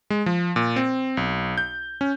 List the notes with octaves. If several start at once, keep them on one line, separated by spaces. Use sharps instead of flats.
G#3
F3
A#2
C4
B1
G6
C#4